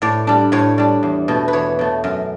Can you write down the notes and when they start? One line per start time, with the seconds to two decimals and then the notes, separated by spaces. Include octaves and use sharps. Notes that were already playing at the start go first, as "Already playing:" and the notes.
0.02 A2 D5
0.27 G3 D4
0.52 A2 C#5
0.78 G3 D4
1.03 E2
1.28 B2 A3
1.48 B4
1.53 E2 C#5
1.79 B2 A3
2.04 F#2